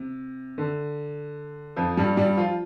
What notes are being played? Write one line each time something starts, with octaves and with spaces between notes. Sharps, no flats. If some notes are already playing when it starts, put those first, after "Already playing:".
Already playing: C3
D3
F2 F3
G2 G3
G2 G3
F3 F4